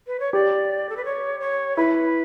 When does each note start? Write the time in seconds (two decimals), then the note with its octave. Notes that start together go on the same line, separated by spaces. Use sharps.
0.07 B4
0.20 C#5
0.33 G4 D5
0.89 A4
0.97 B4
1.05 C#5
1.40 C#5
1.77 E4 B4